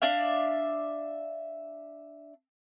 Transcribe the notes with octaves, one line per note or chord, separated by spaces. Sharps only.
D4 D5 E5 F5